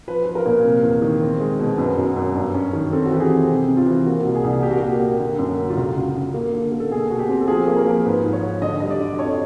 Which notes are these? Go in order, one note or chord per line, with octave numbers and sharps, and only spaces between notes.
F3 B4
F3 B4
A#4
A#2
C3
E2
D#3
C4
G#3
B2
F#2 B4
F#2
F#2
G2
C#4
D#3
C4 A4
F#4
E3 G4
G#4
C4
C3
C3
F4
E3
A#3 F#4
C2
G#4
C2
A#2 G4
F#4
A#3 G4
A#3
D3
F#2
D3
F4
C#2 F#4
C#3
C#3
A#3
D3
A#3
A4
B2 G#4
B2 F#4
G4
C4
A4
F3 G#4
A#3
A#4
F3
G#2 B4
G#2
C#5
G#2
D3 D#5
G3 D#5
D5
D3
F2 C#5